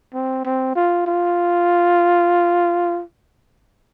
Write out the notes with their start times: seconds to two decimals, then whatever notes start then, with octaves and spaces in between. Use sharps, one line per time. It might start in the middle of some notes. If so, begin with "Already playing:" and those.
0.14 C4
0.45 C4
0.76 F4
1.07 F4